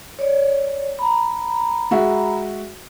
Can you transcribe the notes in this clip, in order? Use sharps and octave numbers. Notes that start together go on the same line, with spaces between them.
C#5 D5
A#5 B5
G#3 F#4 E5